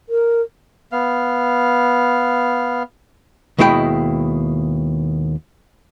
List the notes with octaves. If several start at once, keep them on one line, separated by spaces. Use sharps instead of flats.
A#4
B3 F5
D#2 B2 G#3 E4 G#4 G5